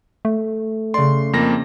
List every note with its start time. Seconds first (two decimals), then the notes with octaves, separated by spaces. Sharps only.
0.25 A3
0.94 C#3 D5 C6
1.33 F2 A#3 A#6